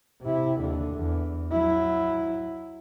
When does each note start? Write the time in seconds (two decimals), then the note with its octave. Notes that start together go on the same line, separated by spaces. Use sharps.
0.22 C3 E4
0.61 D#2 D3
0.94 E2
1.52 F#3 E4